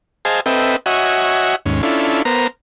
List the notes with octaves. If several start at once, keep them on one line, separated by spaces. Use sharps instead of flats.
G#4 C5 D#5 F5 G#5 A5
C4 A4 B4 D#5 E5 G5
F#4 C#5 D#5 E5 F#5 G#5
D#2 G#2 C#4
C#4 D4 E4 F4 A4
B3 A#4 C5 A#5